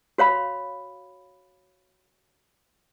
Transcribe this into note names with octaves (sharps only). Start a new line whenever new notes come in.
F#4 C#5 F5 B5